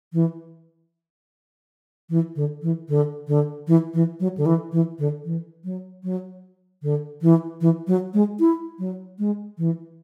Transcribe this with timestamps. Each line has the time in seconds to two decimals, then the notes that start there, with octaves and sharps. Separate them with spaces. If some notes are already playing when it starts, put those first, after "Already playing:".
0.13 E3
2.09 E3
2.36 D3
2.62 E3
2.88 D3
3.28 D3
3.67 E3
3.94 E3
4.20 F#3
4.38 D3
4.46 E3
4.72 E3
4.99 D3
5.25 E3
5.64 F#3
6.04 F#3
6.82 D3
7.22 E3
7.61 E3
7.87 F#3
8.14 G#3
8.39 E4
8.79 F#3
9.19 G#3
9.58 E3